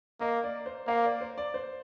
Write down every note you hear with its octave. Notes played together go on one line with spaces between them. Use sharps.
A#3 D#5
D5
C5
A#3 F5
D5
C5
D5
C5